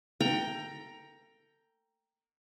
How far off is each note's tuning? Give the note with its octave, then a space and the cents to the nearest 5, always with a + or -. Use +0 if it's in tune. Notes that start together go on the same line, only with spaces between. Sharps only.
A4 +40 G5 +0 A#5 +10